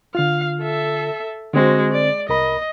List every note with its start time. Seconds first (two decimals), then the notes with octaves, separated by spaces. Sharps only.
0.15 D3 F4 F5
0.61 A4 E5
1.54 D3 G#3 C4 F#4 C5
1.92 D5
2.29 C2 A#4 D#5 B5